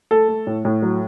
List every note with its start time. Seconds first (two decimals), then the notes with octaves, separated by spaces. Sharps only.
0.11 A3 A4
0.28 A3
0.47 A2
0.65 A2
0.82 F#3